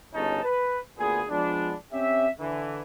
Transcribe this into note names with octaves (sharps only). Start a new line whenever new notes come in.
G1 C#3 C#4 D#4 A5
B4
D2 A#2 B3 G#4
F3 G#3 B3 D4
C4 C#4 G4 E5
D3 E3